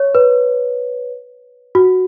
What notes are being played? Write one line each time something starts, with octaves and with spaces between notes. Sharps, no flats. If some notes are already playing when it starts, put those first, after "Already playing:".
Already playing: C#5
B4
F#4